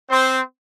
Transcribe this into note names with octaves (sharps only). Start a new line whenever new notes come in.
C4 C5